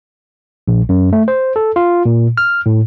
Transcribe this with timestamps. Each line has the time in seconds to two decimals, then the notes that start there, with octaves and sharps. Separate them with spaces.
0.68 A#1
0.89 F#2
1.13 A3
1.28 C5
1.56 A4
1.76 F4
2.05 A#2
2.38 F6
2.66 A2